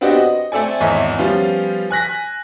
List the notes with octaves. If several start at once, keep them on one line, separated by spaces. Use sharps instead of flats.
B3 C4 D4 F#4 G4 D#5
D#5
A3 C4 A4 D5 G#5
G#1 E2 C#5 D#5 E5
F3 G3 B3 C#4 F4
G#5 F#6 A#6 B6